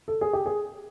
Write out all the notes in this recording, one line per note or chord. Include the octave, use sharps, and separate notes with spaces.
A4
G#4
G4
G#4